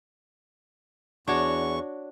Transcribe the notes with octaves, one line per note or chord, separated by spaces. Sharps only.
E2 D4 F#4 C#5 C#6